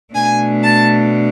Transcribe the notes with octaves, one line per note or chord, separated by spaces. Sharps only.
B2 A3 D4 G#5
A5